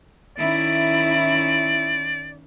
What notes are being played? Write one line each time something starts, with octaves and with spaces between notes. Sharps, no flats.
D#3 C#4 E4 D5